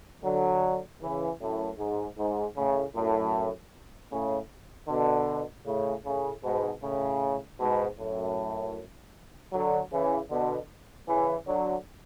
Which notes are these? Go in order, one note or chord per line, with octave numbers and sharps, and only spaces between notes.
D3 F#3
C#3 E3
F#2 A2
G#2
G#2
A2 C#3
F#2 A2
A2 C#3
B2 D3
A2 C#3
A2 C#3
G#2 B2
A2 C#3
G#2 B2
F#2 A2
D3 F#3
C#3 E3
B2 D3
C#3 E3
D3 F#3